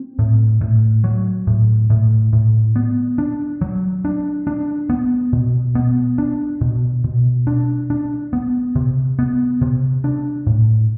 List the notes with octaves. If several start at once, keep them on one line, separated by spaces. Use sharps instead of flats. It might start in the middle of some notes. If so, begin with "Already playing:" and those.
Already playing: C4
A2
A2
F#3
A2
A2
A2
B3
D4
F#3
D4
D4
B3
B2
B3
D4
B2
B2
D4
D4
B3
C3
B3
C3
D4
A2